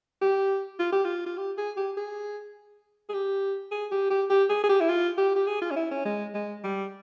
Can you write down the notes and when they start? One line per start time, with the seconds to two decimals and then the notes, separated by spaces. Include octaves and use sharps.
0.22 G4
0.79 F4
0.92 G4
1.05 F4
1.26 F4
1.38 G4
1.58 G#4
1.77 G4
1.97 G#4
3.09 G#4
3.14 G4
3.71 G#4
3.92 G4
4.10 G4
4.30 G4
4.50 G#4
4.64 G#4
4.69 G4
4.80 E4
4.89 F4
5.18 G4
5.36 G4
5.47 G#4
5.62 F4
5.71 C#4
5.76 E4
5.91 C#4
6.05 G#3
6.34 G#3
6.64 G3